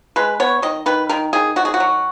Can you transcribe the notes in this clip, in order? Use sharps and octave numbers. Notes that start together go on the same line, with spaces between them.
G#3 B4
B3 C#5
D#3 D#5
D#3 B4
D#3 A#4
D#3 G#4
D#3 F#4
G#4
F#4
F#3